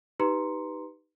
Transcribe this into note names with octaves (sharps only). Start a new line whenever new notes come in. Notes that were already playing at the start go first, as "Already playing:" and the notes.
D#4 G4 B4 A#5 C6 C#7